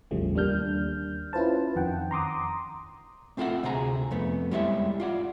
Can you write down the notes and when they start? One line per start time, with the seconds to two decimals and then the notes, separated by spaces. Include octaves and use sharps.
0.11 A1 E2 C#3 F3 G3 A3
0.35 D#2 G3 A#3 D4 F6 G6
1.33 C#4 E4 F4 B4 C5 A5
1.76 F2 D#3 F#5 G5
2.11 A#5 C6 D6 D#6
3.37 A3 C4 F4 A4 E5 F#5
3.63 D2 C3 C4 G#4 A#5
4.11 F2 A3 B3
4.51 G3 G#3 E4 C#5 D5 E5
5.00 F4 D5 F#5